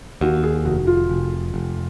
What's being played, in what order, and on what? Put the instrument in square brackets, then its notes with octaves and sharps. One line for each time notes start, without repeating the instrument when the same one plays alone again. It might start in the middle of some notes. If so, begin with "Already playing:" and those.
[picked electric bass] D#2 [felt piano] F#4
[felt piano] G#4
[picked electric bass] F1 [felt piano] F#4
[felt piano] F4
[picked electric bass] F1
F1